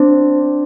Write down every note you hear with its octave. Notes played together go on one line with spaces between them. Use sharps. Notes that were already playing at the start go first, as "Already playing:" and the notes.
Already playing: C4 D4